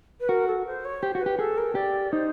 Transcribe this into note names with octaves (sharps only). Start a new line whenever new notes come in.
B4
F#4 A#4
A4
C5
C#5
G4 C5
F#4
B4
G4
G#4 A4
A#4
G4 D5
D#4 C5